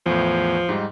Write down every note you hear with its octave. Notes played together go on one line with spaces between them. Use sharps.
E2 A2 F3
G#2 G3 D#4